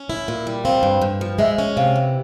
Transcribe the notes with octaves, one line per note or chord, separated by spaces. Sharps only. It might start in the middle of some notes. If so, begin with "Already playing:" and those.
Already playing: C#4
E4
A#2
G3
C4 F5
G2
G2
F3
G#3 E5
C#4
C3 F5
E3